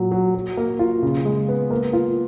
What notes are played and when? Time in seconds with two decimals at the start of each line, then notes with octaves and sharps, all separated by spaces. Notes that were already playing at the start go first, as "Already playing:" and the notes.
Already playing: A#2 F#3
0.11 F#3
0.35 F#3
0.57 A#3
0.79 F4
1.03 C#3
1.25 G#3
1.49 B3
1.71 A#3
1.93 F4